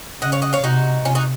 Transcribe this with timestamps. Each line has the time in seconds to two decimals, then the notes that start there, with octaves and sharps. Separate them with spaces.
0.21 C#3 D#5 F#5
0.32 C#5 F5
0.42 D#5 F#5
0.53 C#5 F5
0.64 C3 D#4 F#4
1.05 C3 C#4 F4
1.15 D#4 F#4